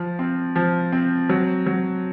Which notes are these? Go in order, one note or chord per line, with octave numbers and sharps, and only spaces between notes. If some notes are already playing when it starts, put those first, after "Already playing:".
Already playing: F3
C4
F3
C4
F#3
F#3